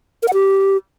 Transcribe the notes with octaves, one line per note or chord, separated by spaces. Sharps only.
A#4
F#5
G4